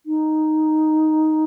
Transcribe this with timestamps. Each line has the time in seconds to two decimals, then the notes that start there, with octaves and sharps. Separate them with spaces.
0.06 D#4